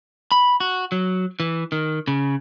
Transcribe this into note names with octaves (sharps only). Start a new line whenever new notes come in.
B5
F#4
F#3
E3
D#3
C#3